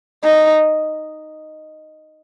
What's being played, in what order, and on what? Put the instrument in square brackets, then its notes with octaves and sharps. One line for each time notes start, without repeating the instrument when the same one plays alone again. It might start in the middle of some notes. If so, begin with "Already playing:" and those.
[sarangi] D#4